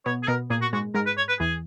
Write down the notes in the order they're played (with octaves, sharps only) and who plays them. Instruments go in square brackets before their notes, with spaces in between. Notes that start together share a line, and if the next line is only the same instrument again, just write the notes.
[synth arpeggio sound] B2 B3 [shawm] C#5
[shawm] G#4
[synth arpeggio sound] B2 B3 [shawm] A#4
[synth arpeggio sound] A#2 A#3 [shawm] G#4
[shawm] F#4
[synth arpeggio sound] G#2 G#3 [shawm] F#4
[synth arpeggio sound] G#2 G#3 [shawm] A#4
[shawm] B4
C#5
B4
[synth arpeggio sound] E2 E3 [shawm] G#4